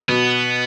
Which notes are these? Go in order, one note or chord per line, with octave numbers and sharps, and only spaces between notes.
B2 B3